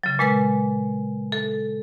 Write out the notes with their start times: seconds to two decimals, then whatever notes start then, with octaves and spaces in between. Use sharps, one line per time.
0.03 C#3 F#3
0.19 A#2 G#3 B4 A6
1.32 A4